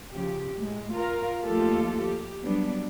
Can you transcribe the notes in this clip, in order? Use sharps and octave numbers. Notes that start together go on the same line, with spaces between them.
C#3 F3 G4
A2 G#3
F4 A#4 F5
D#2 F3 A3 F4 G4 A4
G4
F#3 G3 B3 D4